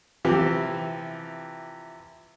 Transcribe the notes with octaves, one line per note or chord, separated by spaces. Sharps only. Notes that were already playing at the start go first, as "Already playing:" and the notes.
C3 E3 F3 G4